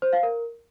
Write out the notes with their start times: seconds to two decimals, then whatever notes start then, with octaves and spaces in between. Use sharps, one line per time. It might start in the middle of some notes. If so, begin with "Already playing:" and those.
0.02 C5
0.13 F5
0.23 A#4